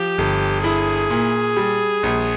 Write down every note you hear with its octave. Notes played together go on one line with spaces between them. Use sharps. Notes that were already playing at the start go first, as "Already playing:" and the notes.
Already playing: F3 G4
G1
E4 G#4
A#2
G3
A#1